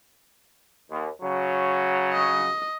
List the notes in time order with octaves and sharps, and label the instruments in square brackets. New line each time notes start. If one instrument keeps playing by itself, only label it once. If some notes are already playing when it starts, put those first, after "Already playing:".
[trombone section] D#2
C#3 F#3
[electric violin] D#5